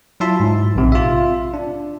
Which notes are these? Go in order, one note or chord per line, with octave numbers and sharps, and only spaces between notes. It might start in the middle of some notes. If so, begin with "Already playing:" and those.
F#3 E4 F4 E5 A5 C6
G#2
A#1 C3
F4 E5
D4